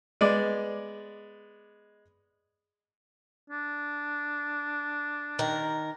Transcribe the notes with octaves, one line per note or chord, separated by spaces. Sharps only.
G#3 B3 D5
D4
D#3 A#4